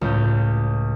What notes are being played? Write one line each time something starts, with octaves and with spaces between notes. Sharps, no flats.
C#2 A2 G6